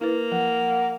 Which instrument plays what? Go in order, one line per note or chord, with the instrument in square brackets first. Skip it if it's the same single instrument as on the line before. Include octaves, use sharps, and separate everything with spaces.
[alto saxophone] A#3 [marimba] E4 B4
[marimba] F3 [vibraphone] F#5